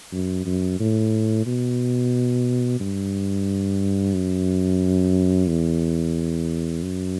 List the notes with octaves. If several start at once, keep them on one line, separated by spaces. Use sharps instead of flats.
F#2
F#2
A2
B2
G2
F#2
E2
F#2